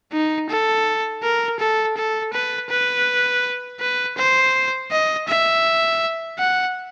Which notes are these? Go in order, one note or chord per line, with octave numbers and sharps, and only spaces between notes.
D#4
A4
A#4
A4
A4
B4
B4
B4
C5
D#5
E5
F#5